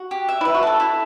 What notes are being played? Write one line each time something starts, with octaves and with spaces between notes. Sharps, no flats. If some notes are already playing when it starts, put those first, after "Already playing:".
Already playing: F#4
G4
E5
E4 B4
F#4
A4 A5
E4